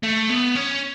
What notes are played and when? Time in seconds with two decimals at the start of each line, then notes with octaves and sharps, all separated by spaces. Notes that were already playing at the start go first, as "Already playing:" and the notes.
0.03 A3
0.30 B3
0.55 C#4